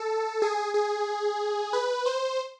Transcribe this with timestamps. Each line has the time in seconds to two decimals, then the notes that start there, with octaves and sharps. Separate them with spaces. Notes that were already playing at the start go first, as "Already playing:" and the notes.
Already playing: A4
0.42 G#4
0.74 G#4
1.73 B4
2.06 C5